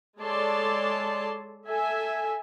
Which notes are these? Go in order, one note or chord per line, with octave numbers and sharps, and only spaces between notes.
G#3 A4 C#5 D5 A5 C6
A4 E5 G#5